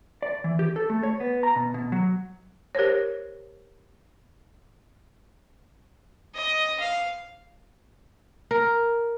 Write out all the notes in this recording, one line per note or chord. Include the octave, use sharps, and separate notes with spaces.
D5
E3
G4
A4
A3
C#5
B3
A#5
B2
B2
F#3
G4 A#4 C5 C#5
D#5
F5
A#4